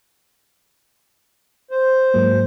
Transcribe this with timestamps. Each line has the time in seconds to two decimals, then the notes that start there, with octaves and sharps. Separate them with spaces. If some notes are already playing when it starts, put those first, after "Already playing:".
1.71 C5
2.14 G#2 F#3 A#3